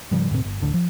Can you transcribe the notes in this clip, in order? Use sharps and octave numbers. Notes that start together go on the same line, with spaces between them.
G#2 C#3 F3 G3
D2 G#2 B2 C4
G1
A1 D2 D3 D4
F3